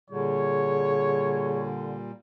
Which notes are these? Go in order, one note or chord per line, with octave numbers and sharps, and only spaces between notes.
A#2 D3 G3 G#4 C#5